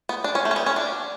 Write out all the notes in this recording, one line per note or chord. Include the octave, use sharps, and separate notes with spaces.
B3
D4
C#4
A3
C#4
B3
C#4
D4